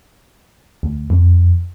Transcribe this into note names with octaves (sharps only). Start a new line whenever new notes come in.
D2
F2